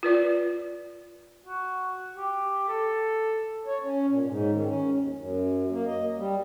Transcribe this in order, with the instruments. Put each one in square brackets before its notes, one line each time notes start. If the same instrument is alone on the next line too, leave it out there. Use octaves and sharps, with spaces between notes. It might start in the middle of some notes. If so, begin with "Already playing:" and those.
[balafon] F4 B4 D5
[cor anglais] F#4
G4
A4
[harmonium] C#5
C#4
A#2
G#2
D#3
C#4
D#2
F#2
A#3
D#5
G3